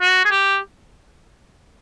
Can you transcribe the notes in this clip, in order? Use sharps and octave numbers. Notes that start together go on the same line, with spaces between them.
F#4
G#4
G4